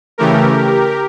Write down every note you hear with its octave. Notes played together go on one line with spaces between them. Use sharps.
C#3 E3 A3 G4 A#4